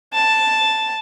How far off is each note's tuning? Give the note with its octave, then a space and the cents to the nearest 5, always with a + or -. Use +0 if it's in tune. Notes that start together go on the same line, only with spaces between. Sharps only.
A5 +0